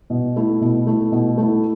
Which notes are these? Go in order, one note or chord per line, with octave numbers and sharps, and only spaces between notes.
B2
A3 E4
B2
A3 E4
B2
A3 E4